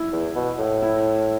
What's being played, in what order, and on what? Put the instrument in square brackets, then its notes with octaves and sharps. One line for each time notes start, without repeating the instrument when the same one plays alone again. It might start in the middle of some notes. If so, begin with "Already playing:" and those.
Already playing: [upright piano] E4
[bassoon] E2
B2
A2
[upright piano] E4